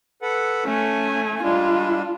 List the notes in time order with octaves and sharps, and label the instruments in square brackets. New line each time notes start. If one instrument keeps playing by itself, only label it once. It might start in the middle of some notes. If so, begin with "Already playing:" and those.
[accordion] A4 B4 F#5
[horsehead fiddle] A3 G#5 [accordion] C#4
[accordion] G3 G#3 D4 [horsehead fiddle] F4